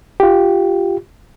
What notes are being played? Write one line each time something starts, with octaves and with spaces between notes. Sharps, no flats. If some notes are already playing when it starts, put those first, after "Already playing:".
F4 G4